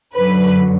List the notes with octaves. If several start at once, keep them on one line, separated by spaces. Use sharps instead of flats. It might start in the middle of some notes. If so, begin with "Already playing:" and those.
F#2 D3 F#3 B4